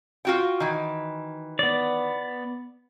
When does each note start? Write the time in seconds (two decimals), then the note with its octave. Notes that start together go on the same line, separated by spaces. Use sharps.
0.25 F4 F#4 G5
0.60 D#3 E3
1.59 B3 D5